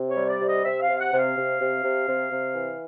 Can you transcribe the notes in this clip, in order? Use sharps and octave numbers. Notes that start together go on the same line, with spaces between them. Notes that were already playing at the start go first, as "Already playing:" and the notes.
Already playing: C3
C#5
G3
D5
C3
D#5
C3 E5
F5
C3
F#5
C3
F5
C3
C3
C3
C3
C3
E3